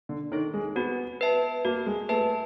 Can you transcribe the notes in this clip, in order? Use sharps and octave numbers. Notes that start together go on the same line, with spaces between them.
D3
D#3 A4 C#5
G#3
B3 F#4
B4 E5 A5
A#3 F#4
G#3
A3 B4 E5 A5